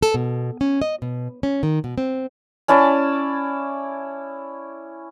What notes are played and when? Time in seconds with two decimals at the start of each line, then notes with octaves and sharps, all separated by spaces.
0.03 A4
0.14 B2
0.61 C#4
0.82 D#5
1.02 B2
1.43 C#4
1.63 D#3
1.84 B2
1.98 C4
2.68 C#4 E4 D5 A5